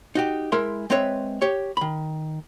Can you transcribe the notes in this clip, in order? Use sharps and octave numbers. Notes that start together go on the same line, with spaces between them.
D#4 F#4 G4
G#3 E4 A#4 E5 C6
G#3 C4 B4 C#5 E5
G4 C#5
D#3 B5